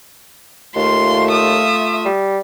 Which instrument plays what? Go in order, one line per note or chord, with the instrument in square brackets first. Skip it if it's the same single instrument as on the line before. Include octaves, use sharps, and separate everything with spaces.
[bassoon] D#2 [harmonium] A3 F4 [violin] C6
[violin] E5 D#6
[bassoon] G3